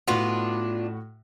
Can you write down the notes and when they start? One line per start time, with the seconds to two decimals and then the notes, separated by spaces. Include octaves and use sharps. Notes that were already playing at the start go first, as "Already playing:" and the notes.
0.08 A2 B3 D4 F4 F#4